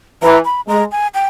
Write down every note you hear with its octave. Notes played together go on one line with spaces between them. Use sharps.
E3 A#5
B5
G#3 A#5
G#5
G5